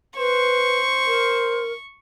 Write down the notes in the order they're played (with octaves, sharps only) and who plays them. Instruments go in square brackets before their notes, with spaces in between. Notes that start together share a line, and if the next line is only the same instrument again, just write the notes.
[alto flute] B4 [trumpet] C5 [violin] C#6
[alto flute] A#4